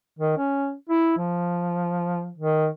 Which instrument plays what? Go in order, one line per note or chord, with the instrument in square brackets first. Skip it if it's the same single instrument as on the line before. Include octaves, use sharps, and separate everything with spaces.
[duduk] D#3
C#4
E4
F3
D#3